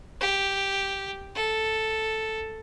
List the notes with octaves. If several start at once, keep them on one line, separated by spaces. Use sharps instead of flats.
G4
A4